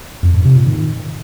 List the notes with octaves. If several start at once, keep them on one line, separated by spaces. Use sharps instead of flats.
F2
G#2
C3
A#2
D#3